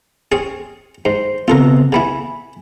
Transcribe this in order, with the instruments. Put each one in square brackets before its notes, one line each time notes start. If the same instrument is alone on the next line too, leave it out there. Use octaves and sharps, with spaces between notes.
[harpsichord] C4 C#4 G#4
[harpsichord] G#2 [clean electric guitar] C5
[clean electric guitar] C#3 B3 C4 [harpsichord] F4 A4 A#4
[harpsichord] C#3 B3 E4 [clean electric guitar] G#5 B5